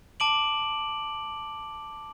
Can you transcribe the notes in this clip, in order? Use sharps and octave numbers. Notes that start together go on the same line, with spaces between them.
A5 D6 D7 F#7